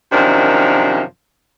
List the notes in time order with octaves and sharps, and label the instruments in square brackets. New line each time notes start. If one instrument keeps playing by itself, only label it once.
[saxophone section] F#2 C3 D#3 F3 D4